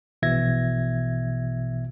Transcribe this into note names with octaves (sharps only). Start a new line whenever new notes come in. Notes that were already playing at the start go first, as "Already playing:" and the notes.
A#1 B2 E3 E5 G#6 A#6